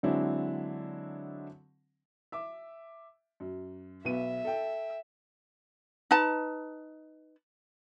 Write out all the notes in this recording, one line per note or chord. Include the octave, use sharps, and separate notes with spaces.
D3 F#3 G#3 C4 D4 E4
E5 D6
F#2
B1 B3 E5 D#7
A4 G5
D#4 B4 A5